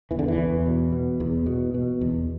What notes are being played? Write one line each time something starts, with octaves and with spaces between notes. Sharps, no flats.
E2 E3
D3
E3
E2
B2
B2
E2
B2
B2
E2